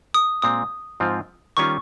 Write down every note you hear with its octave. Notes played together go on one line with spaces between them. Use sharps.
D#6
A#2 G#3 C4 D#6
G#2 F3 C4 F4
D#3 G3 C#4 F4 C#6